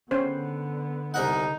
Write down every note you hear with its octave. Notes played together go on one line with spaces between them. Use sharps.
D3 B3 C#4 C5
C2 D#4 A#4 F#5